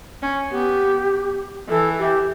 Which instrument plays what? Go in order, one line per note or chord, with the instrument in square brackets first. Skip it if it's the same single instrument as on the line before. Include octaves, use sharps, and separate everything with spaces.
[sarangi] C#4
[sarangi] B3 [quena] G4
[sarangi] E3 [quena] A4
[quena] G4